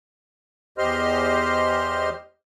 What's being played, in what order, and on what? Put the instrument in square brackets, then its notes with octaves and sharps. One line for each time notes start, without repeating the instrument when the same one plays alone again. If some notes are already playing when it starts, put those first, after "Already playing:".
[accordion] E2 G4 C5 D#5 C6 F6